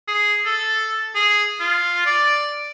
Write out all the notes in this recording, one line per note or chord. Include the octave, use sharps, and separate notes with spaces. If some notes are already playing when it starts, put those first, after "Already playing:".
G#4
A4
G#4
F4
D5